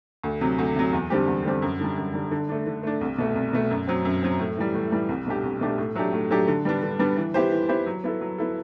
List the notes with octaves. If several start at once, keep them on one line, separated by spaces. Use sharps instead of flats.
D2
C3 F#3
D2
C3 F#3
E2
D3 G3 C4 G4
E2
D3 G3 C4 G4
F#2
D3 G3
F#2
D3 G3
D3
A3 D4
D3
A3 D4
C2
B2 A3
C2
B2 A3
F#2
F#3 C4
F#2
F#3 C4
A2
E3 G3
A2
E3 G3
C2
B2 A3 D4 G4
C2
B2 A3 D4 G4
A2
F#3 A3 D4 G4
A2
F#3 A3 D4 G4
D3
G3 B3 D4
D3
G3 B3 D4
E3
B3 E4 G4 C5
E3
B3 E4 G4 C5
F#3
B3 E4 A4
F#3
B3 E4 A4